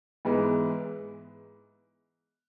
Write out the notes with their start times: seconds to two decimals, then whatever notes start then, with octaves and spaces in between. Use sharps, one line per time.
0.25 G#2 E3 G#3 B3